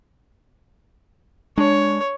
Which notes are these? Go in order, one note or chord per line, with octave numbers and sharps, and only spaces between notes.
G#3 D4 C#5